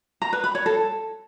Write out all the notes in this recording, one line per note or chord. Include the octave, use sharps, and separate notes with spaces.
A#5
B4
B5
C#5
A4